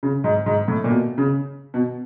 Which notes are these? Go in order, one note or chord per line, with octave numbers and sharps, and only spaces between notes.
C#3
G#2
G#2
A2
A#2
B2
C#3
B2